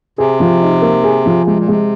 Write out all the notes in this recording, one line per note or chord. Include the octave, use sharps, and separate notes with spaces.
C3 G#4
F3
D#4
A#3
G#4
F3
C3 G#3
A#2
C3 G#3